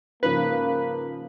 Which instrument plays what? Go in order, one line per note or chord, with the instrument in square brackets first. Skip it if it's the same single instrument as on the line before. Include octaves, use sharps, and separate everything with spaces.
[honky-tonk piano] G#2 C#3 F3 [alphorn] A#3 [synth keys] B4